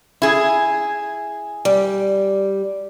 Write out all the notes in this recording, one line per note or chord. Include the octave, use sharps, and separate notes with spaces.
E4 G#4
G3